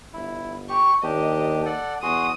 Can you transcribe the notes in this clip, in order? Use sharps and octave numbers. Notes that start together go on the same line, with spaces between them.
G1 E4
G4 C#6
D#2 D4 G4 D#5
A4 D5 F#5
E2 F#4 G#4 C6 D#6